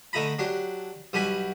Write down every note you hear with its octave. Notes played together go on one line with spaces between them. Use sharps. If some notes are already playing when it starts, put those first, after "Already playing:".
D3 A3 D#4 A#5 B5
F#3 D4 G4
B1 G3 F#4 G4 G#5 B5